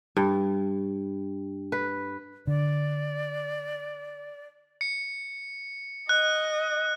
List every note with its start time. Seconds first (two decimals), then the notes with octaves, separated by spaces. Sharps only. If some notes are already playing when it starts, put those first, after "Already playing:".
0.17 G2
1.72 B4
2.47 D3 D5
4.81 C#7
6.09 D#5 F#6